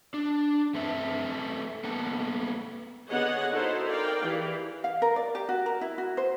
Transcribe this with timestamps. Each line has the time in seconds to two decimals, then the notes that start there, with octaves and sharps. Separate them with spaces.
0.14 D4
0.74 A3 C4 A4 B4 E5
1.84 A#3 B3 A4 B4
3.09 D3 B3 G#4 C#5 D#5 F#5
3.52 D#4 E4 F#4 A4 C5
3.86 A#4 D5 F5 G5
4.22 E3 G4 G#4
4.84 F5
5.02 A#4
5.16 D5
5.35 G4
5.49 F#4
5.66 A#4
5.81 E4
5.98 F#4
6.17 C5